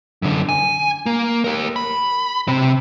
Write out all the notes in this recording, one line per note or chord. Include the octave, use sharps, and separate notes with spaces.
F#2 D3
G#5
A#3
G4 A#4
B5
C3 C4